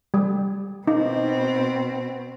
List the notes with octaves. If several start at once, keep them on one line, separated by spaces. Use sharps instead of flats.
G3
B2 C4 D#4